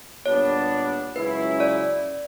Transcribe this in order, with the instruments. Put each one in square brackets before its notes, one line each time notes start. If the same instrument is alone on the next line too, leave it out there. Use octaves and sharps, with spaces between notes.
[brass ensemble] A#2 G3 B3 D4 [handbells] C#5
[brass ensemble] C#2 C#3 F#3 C#4 E4 [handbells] B4
[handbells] D5